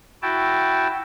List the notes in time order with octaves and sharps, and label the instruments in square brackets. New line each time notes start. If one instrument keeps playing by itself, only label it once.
[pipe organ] E4 F#4 G5 A5